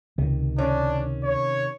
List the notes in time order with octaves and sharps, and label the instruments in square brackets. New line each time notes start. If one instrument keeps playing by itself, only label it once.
[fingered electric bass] C#2 [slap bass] C3 D#3
[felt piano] C#4 [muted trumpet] D4
[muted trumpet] C#5